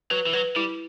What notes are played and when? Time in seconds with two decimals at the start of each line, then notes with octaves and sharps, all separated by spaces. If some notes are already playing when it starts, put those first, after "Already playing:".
0.11 F#3 B4
0.26 E3
0.33 F#3 B4
0.56 G3 E4